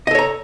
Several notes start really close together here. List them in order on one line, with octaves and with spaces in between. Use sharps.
D#5 A4 C#5 A#5